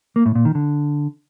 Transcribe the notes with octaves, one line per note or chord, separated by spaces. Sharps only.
A#3
A2
A#2
D#3
D3